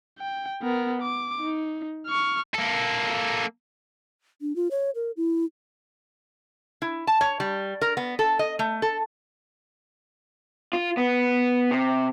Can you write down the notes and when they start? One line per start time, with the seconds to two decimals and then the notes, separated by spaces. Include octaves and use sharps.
0.19 G5
0.62 B3 A#4
1.02 D6
1.40 D#4
2.06 C#6 F6
2.54 A#3 A4
4.41 D4
4.56 F4
4.71 C#5
4.95 A#4
5.17 E4
6.82 E4
7.07 A5
7.21 C#5
7.40 G3
7.81 A#4
7.97 B3
8.19 A4
8.39 D#5
8.59 A3
8.82 A4
10.73 F4
10.97 B3
11.71 C3